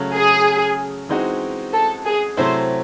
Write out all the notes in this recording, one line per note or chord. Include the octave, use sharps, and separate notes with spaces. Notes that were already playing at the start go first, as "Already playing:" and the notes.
Already playing: C#3 F#3 A3
G#4
E3 G#3 C4 D#4 F#4
A4
G#4
C3 F#3 A3 C4 E4 C5